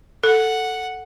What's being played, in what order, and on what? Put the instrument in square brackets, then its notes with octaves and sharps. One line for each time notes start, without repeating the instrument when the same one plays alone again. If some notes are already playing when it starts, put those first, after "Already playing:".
[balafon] A4 [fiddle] F#5